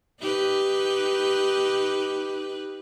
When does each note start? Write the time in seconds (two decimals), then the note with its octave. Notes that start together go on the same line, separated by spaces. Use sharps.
0.20 D#4 G4 B4